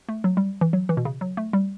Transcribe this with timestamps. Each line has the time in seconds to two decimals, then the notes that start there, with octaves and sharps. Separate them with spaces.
0.09 A3
0.24 F#3
0.37 G3
0.61 E3
0.73 F#3
0.89 E3
0.97 B2
1.05 C#3
1.21 F#3
1.37 A3
1.53 G3